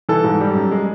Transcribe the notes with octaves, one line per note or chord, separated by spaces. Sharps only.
E3 A4
G#2
G3
F#2
G#3